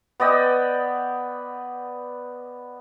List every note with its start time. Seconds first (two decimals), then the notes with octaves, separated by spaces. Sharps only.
0.20 B3 D5 D#5 G5